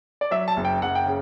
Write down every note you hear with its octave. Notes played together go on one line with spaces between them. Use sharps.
D5
F#3 E5
A5
F#1
G5
F#1 F#5
G5
C#3